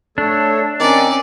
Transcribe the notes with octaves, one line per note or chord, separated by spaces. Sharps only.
A3 D4 A4 C#5
D#3 C4 C#4 D5